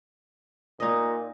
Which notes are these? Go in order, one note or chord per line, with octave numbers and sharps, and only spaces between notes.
A#2 D#4 D#5